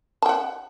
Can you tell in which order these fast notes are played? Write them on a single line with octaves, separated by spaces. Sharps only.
A5 G5 F#5